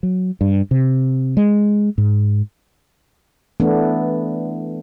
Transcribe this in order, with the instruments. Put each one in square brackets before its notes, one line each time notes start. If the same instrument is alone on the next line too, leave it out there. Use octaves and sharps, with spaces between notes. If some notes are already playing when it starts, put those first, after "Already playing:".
[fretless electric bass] F#3
G2
C3
G#3
G#2
[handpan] E3 A3 B3 D4